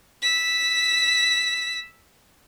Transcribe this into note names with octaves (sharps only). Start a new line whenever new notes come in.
E6 B6